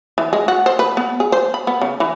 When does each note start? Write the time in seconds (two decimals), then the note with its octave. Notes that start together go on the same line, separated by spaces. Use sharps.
0.18 E3
0.33 G#3
0.48 F#4
0.66 C5
0.79 B4
0.97 B3
1.20 G#4
1.32 C5
1.54 B5
1.67 B3
1.81 C#3
2.00 E3